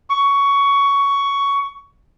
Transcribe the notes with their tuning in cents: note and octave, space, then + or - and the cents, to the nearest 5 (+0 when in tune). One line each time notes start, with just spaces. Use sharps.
C#6 +15